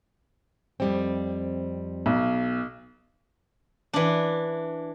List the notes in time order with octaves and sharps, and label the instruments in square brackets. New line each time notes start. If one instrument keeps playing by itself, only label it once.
[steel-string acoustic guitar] F2 G3 C4
[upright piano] B1
[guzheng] E3 D4